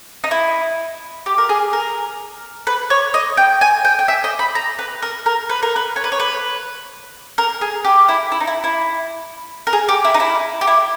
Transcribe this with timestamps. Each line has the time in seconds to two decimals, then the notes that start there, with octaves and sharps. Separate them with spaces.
0.24 D#4
0.31 E4
1.26 G4
1.38 A#4
1.49 G#4
1.73 A#4
2.67 B4
2.90 C#5
3.14 D#5
3.37 G5
3.61 G#5
3.85 G5
3.99 G5
4.08 E5
4.24 D#5
4.39 B5
4.55 A#5
4.79 B4
5.02 A#4
5.26 A#4
5.50 B4
5.63 A#4
5.76 B4
5.96 C#5
6.04 B4
6.12 C#5
6.20 B4
7.38 A#4
7.61 G#4
7.85 G4
8.08 E4
8.32 E4
8.40 D#4
8.47 E4
8.64 E4
9.67 A#4
9.73 G#4
9.89 G4
10.04 E4
10.14 D#4
10.20 E4
10.61 G4
10.67 E4